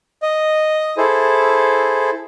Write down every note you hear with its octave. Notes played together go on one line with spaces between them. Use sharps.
D#5
E4 G#4 A4 C5